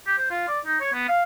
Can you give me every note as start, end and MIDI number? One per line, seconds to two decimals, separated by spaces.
0.06 0.15 67
0.18 0.30 72
0.31 0.45 65
0.48 0.60 74
0.66 0.78 63
0.81 0.89 73
0.93 1.08 59
1.08 1.23 77